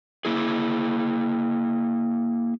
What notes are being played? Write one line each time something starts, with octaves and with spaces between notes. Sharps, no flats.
A#3 E4 G#4